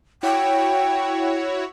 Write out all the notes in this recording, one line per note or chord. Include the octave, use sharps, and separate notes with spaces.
E4 F#4 C#5 G5